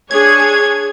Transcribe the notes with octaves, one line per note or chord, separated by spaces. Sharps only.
D4 G#4 C#5 G#6